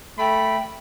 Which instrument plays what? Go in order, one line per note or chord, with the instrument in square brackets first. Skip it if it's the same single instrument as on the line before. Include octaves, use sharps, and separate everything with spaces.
[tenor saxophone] A3 [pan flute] G5 [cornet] B5